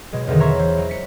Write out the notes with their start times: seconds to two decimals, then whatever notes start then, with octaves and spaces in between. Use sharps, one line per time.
0.13 B2 F#3 G#3
0.27 E2 B2 D3 D#3 F#3
0.40 C#5 E5 A#5 C6 C#6
0.59 E3 C5
0.78 F#3
0.89 B6 C#7